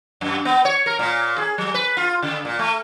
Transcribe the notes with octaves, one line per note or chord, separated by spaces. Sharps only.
F#2
B3
C#5
A#4
A#2
G#4
F#3
B4
F4
C#3
A#2
A3